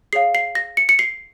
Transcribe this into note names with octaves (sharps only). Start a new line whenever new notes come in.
G#4 C#5 F5 C7
C7
A#6
C#7
C#7
C7